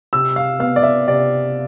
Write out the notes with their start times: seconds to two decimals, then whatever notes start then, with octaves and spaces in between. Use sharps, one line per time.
0.13 C3 E6
0.36 F5
0.60 B3 F5
0.76 D5
0.83 E5
1.07 C3 D5